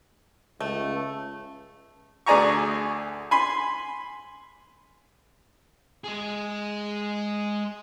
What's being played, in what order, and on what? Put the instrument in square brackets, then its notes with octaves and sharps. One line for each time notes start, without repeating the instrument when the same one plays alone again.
[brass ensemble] C#2 [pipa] A3
[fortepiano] D2 G#4 D5 G#5 A#5 C#6
G#5 B5 C6
[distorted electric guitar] G#3 G#4